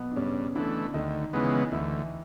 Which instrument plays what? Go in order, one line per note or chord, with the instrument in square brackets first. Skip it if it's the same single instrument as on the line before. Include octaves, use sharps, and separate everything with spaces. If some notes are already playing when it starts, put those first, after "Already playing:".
Already playing: [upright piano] B2 F#3 B3 F#4
D4
[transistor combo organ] G2 [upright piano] C#3 C#4
[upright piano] D3 D4 [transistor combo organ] E3 A3
[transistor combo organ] D2 [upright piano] D#3 D#4
[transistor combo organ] C#3 E3 G#3 B3
[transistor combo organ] D2 [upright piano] E3 E4